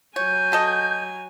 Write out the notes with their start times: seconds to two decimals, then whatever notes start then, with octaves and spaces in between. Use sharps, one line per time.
0.16 F#3 C#5 G#5 G6
0.52 F#4 A4 D#5